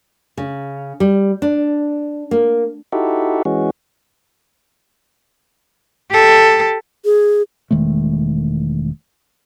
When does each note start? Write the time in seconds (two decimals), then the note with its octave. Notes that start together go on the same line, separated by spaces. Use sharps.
0.37 C#3
1.00 G3
1.42 D4
2.31 A#3
2.92 D#4 E4 F#4 G4 A4
3.45 E3 G#3 C#4 F#4
6.11 G4 A4
7.05 G#4
7.71 E1 D#3 G#3 A3